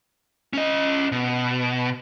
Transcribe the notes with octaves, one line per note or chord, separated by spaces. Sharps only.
C#4 D#5
B2